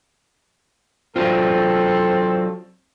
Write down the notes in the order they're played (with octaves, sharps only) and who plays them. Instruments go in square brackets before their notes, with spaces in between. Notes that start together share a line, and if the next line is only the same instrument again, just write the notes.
[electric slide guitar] F#3 D4 F4 [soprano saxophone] C4 [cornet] A4